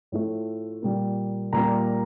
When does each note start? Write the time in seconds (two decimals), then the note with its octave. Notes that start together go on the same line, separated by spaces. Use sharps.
0.12 A2 F3 A3
0.82 A#2 G3 A#3
1.53 A#2 G3 A#3 A#5